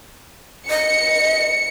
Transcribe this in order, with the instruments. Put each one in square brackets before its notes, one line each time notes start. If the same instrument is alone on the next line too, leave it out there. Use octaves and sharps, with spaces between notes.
[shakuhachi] D#5 [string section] C#7